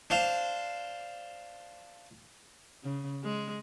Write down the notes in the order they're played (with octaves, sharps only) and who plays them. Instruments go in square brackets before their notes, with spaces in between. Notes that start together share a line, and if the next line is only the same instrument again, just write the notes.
[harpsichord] D4 C5 F5
[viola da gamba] C#3
G#3